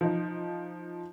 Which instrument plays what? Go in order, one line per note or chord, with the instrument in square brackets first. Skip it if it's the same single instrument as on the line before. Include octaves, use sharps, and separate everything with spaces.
[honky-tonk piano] F3 D#4